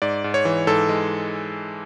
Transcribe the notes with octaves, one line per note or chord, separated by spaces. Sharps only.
G#2 D5
G#2
C#5
E3
G#2 A4
G#3